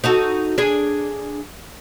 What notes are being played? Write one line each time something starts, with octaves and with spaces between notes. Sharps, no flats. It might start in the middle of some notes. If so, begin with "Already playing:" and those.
D#4 F#4 A4
D4 G#4